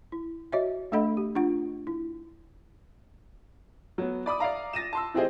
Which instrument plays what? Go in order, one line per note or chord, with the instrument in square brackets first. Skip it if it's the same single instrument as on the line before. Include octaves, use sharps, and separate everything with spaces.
[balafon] E4
F#4 C#5 D#5 E5
A3 D4 A4 D#5 F#5 B5
G4
D4 F4 F#5
E4
[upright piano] F#3 B3
D5 B5 D6 D#6
D5 E5 F5 A#5
A6 A#6 D#7 E7
A5 C6 E6
E3 C4 G4 G#4 C5 D#5